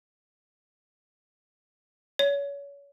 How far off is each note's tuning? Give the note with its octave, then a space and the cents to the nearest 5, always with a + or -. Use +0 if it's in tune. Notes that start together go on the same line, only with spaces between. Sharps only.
C#5 +30